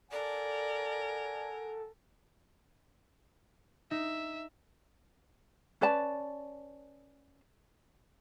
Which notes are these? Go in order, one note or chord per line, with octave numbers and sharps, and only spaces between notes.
A4 A#4 D5 F#5 G#5
D#4 E5
C#4 B4 D5 A5